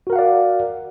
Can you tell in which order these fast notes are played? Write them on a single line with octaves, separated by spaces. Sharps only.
F#4 A#4 F#5 F5 D5